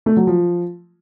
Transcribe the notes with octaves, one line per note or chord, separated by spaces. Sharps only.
A3
F#3
F3